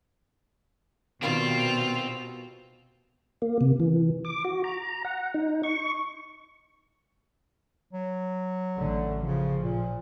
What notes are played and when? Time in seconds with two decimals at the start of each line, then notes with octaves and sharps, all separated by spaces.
1.22 B2 D#3 G3 A#3 C4 F4 F#4
3.42 A#3
3.61 C3
3.80 E3
4.25 D6
4.45 F#4
4.64 A#5
5.05 F#5
5.34 D#4
5.63 C#6
7.93 F#3
8.77 A1 D3 A3
9.24 C#3 F3
9.62 A#2